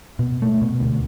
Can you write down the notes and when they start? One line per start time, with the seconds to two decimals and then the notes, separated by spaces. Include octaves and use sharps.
0.19 B2
0.42 A3
0.62 B2
0.80 D2